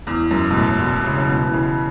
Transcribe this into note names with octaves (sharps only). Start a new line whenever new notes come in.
E2
F#2
B2
A2
B2
C#3
C#3
B2
E3
C#3